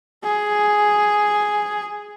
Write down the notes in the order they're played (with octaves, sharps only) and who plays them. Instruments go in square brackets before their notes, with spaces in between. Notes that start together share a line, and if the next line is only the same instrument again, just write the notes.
[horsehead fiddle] G#4